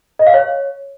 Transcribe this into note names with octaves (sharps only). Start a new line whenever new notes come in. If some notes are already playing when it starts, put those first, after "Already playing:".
D#5
F5
C#5